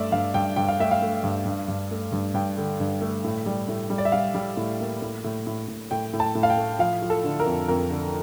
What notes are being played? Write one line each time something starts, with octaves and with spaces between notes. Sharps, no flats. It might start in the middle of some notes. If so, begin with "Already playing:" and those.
Already playing: G2 A3 D5 E5
G2 F5
G2 G5
G2 G5
F5
A3 E5
F5
A3
G2
G2
G2
A3
G2
G2 G5
D3
G2
A3
A2
G3
A2
G3
D5
E5
G3 F5
G3
A2
A#3
A2
A2
A2
A2
A2 G5
A2
A5
A2
F5
G5
A3
F3 F5
F3
A4
D3
A#4
F2
F2 A#4
D3